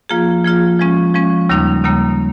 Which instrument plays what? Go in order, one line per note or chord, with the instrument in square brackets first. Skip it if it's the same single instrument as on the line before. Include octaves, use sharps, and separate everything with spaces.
[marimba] F3 A#3 F4 G#4
F3 A#3 F4 G#4
F3 G#3 C#4
F3 G#3 C#4
D#2 C#3 G3 A#3 D#4
D#2 C#3 G3 A#3 D#4